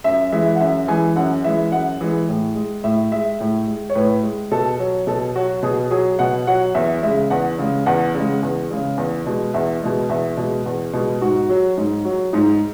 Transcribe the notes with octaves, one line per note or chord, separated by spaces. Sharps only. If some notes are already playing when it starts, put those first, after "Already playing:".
F#2 E5
E3 G#3 E5
F#5
F#2 E5
E3 G#3 G#5
F#2 F#5
E3 G#3 E5
F#2 F#5
E3 G#3
A2
G#3
A2 E5
G#3 E5
A2
G#3
C#5
A2 B4
G#3
B2 A4
F#3
B2 A4
F#3 F#4
B2 G#4
F#3 G#4
B2 F#5
F#3 F#5
E2 E5
C#3 G#3 E5
E2 F#5
C#3 G#3
E2 F#5
C#3 G#3
E2
C#3 G#3
E2
B2 G#3
E2 E5
B2 G#3
E2 E5
B2 G#3
E2
B2 G#3
G#2 F#4
F#3
G#2
F#3
G#2 D#4